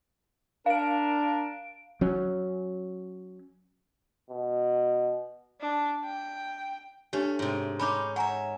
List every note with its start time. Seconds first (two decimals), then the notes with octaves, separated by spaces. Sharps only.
0.66 D4 A#4 F5 D7
2.01 F#3 C#4
4.30 B2
5.61 D4
6.05 G5
7.13 A3 C#4 D4 G4
7.39 G#2 C3
7.80 C#4 D#4 C5 B5 D6
8.16 C#5 E5 F#5 G#5 A#5